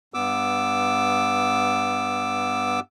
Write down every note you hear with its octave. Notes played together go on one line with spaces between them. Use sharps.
G2 B3 D6 E6